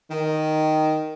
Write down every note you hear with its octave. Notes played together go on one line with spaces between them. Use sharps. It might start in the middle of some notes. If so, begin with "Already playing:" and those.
D#3